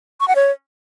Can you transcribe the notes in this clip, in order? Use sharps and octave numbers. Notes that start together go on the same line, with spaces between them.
C#6
F#5
C#5